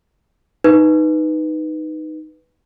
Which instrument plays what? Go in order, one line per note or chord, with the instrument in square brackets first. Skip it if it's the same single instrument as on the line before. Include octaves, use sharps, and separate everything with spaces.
[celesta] D#4 B4